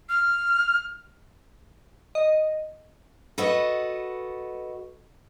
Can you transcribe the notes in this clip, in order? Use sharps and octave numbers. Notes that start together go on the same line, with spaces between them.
F6
D#5
F#4 A4 B4 D#5 F#5